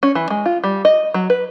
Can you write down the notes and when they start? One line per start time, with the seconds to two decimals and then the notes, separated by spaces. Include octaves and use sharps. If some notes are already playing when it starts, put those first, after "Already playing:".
0.03 C#4
0.15 E3
0.30 G#3
0.45 F4
0.64 G3
0.85 D#5
1.14 F#3
1.30 B4